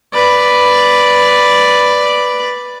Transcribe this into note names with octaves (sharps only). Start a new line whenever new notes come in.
B4 D5